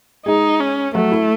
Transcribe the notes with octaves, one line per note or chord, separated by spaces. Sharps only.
G#3 D#4 G#4
C#4
F#3 A3 F#4
E4